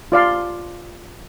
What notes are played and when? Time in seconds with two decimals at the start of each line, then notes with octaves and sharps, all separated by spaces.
0.12 F4 D5 F5 C6